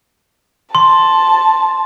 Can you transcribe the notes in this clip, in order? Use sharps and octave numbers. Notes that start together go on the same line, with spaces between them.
A5 C6